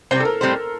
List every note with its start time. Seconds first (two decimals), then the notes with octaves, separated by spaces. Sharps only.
0.11 C3 G3 C4 C5
0.20 A4
0.25 A#4
0.41 A2 G3 C4 G4 C5